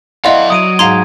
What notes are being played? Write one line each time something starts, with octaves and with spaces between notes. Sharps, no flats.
E4 A4 D5 D#5 F5 F#5 C6
F#3 D#6 D7 D#7
G#2 F5 A#5 C6 G#6